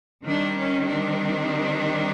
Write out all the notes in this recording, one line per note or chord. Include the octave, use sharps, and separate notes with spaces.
D#3 G3 C4 D4
C#4
D4